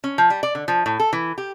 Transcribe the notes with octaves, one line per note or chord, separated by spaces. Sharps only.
C#4
F3
G3
D5
D3
F3
A2
A4
E3
G4